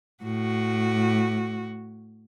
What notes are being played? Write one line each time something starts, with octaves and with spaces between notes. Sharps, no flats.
A2 F#4